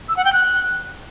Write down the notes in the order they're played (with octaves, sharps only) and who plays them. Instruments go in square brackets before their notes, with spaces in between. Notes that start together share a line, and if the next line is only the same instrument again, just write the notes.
[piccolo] E6
F#5
G5
F#6